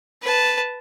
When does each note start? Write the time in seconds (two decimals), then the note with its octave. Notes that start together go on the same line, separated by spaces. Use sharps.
0.22 B4 A5